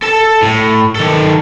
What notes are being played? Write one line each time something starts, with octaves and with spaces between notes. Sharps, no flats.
A4 A5
A2
D#3 A4